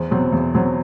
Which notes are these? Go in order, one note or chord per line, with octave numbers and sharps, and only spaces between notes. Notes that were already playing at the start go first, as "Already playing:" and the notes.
Already playing: E2 C5
B2 F#3 C4
E2
B2 F#3 C4